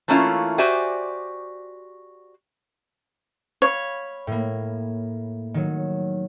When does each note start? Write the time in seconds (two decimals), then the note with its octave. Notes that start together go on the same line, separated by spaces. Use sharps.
0.08 E3 A3 A#3 C#4 E4 F4
0.58 F#4 G4 C5 D5 E5 G#5
3.62 C#5 F5 B5
4.27 A2 A#3
5.54 D#3 F#3